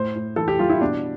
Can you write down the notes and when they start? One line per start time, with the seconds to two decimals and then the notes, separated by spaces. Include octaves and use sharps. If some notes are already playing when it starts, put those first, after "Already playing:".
Already playing: A2 C5
0.15 A2
0.36 E3 A4
0.48 G4
0.59 G3 F4
0.70 E4
0.81 B2 D4